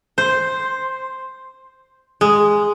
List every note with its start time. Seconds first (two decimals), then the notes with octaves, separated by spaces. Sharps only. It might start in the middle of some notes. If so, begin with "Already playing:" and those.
0.18 C5
2.21 G#3